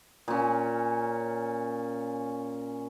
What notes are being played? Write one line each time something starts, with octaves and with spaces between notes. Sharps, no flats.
A#2 C#4